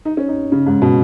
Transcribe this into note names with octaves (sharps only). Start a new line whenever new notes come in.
D#4
C#4
D#4
C#3
G#2
B2